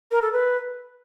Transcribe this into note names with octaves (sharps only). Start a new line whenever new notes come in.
A#4
A4
B4